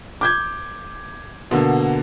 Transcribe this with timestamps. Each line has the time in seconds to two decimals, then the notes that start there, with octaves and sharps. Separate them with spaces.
0.21 D6 G6 G#6
1.51 B2 D3 A#3